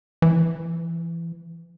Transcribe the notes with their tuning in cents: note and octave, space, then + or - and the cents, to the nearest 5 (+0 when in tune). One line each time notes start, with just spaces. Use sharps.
E3 +25